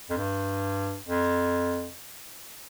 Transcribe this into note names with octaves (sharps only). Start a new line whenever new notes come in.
F2
G2
F2